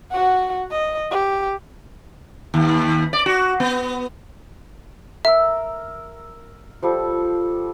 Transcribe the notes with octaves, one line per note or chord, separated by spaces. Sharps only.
F#4 F#5
D#5
G4
D#2
D5
F#4
B3
A#4 E5 E6
F3 G3 A4